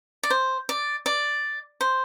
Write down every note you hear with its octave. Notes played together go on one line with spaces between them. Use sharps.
D5
C5
D5
D5
C5